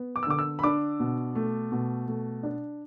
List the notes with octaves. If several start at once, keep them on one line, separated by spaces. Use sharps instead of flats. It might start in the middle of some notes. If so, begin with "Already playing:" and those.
Already playing: B3
D6
E6
D3 D6
E6
B5
D4 D6
B2
A3
B2
A3
D4